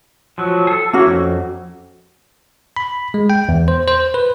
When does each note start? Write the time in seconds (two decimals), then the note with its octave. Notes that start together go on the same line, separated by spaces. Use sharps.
0.38 F3 F#3
0.67 G#4 A4
0.93 A#3 C#4 E4 F#4
1.06 F2
2.77 B5
3.14 G#3
3.30 G5
3.49 E2
3.68 C5
3.88 C5
4.14 B4